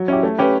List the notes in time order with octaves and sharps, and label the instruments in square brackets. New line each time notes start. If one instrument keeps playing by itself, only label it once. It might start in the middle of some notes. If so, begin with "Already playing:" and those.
Already playing: [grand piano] F#3
C#4 E4 G4
A3
C#4 G4 B4